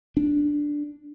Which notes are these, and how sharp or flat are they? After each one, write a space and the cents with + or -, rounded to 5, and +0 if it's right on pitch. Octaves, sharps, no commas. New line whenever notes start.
D4 +0